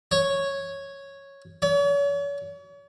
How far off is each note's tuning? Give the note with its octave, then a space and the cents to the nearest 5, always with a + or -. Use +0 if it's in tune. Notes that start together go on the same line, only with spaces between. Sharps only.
C#5 -5
C#5 +40